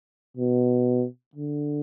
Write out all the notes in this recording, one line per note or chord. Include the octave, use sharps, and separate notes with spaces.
B2
D3